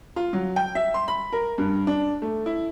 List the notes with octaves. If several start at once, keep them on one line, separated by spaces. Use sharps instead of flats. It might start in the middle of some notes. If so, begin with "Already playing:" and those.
F4
F#3
G5
E5
C6
B5
A#4
G2
D4
A3
E4